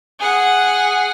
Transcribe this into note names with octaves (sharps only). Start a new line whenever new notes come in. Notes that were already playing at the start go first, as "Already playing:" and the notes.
G#4 F#5